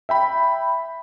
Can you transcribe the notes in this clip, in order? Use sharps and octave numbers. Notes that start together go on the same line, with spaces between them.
E5 G5 B5